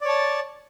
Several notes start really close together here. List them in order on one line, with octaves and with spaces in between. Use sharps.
D5 C#5 A5